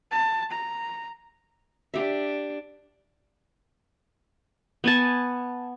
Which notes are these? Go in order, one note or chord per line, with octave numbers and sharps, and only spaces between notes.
A5
A#5
D4 G4 E5
B3 G#5 A5